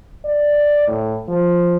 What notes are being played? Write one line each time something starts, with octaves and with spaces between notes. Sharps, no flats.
D5
A2
F3